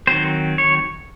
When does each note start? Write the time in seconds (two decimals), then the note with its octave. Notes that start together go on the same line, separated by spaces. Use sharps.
0.07 D#3 F#3 C4 C5
0.58 C#5